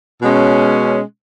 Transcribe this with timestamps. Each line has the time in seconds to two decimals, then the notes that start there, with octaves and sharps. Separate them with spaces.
0.21 B2 G#3 C#4